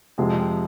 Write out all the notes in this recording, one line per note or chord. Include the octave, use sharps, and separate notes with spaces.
F2 C3 F3 G#3